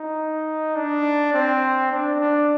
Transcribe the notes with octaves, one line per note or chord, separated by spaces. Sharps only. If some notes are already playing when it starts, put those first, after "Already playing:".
Already playing: D#4
D4
C4
D4
D4